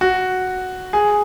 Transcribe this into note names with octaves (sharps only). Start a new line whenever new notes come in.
F#4
G#4